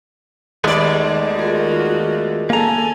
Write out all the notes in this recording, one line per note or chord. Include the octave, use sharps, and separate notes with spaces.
D#2 G#3 A3 B3 D5
F4 F#4 G#4 A#4
A#3 A4 G#5 A#5